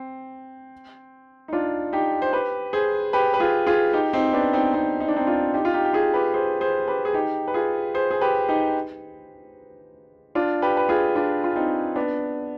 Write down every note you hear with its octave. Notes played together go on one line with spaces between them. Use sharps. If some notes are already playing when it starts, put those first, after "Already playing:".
Already playing: C4
D#4
D4 F4
D#4 G4
C5
G4 B4
G#4 C5
G4 B4
B4
F4 G#4
F4 G#4
D#4 G4
C4 D#4
B3 D4
C4 D#4
C4 D#4
D#4
D4
C4 D#4
D4 F4
D#4 G4
F4
D#4 G4
G4
F4 G#4
G4 B4
G#4 C5
G#4 C5
G4 B4
G#4
D#4 G4
B4
F4 G#4
G#4 C5
G#4
G4 B4
D#4 G4
D4 F4
G4 B4
B4
F4 G#4
D4 F4
F4
C4 D#4
B3 D4